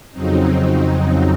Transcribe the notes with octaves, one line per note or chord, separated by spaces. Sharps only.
F2 C#3 F#3 C4 D#4